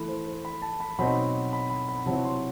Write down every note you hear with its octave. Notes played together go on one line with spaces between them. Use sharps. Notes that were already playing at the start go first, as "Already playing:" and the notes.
Already playing: E3 A3 E4 B5
C5
C5
B5
A5
B5
B2 F#3 C4 D#4 B5
B5
B5
B5
C3 F#3 C4 E4 A5
C6